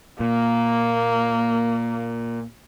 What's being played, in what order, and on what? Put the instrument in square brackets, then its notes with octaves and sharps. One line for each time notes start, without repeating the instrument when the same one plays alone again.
[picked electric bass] A#2 [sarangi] A#3